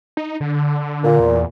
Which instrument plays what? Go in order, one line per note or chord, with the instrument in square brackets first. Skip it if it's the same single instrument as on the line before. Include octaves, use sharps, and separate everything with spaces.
[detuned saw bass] D#4
D3
[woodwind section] A#2
[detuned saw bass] E2